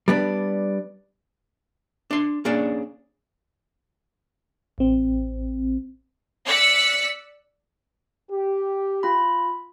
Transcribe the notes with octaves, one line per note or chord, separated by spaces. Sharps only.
G3 B3 D4
D4 C6
A#3 C#4 D4 G#4 D5
A1 C4
D5 E6 F#6 B6 C#7
G4
F4 B5